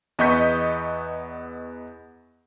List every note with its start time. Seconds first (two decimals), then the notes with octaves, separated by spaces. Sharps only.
0.19 E2 B3 D#5 C#6 G6 B6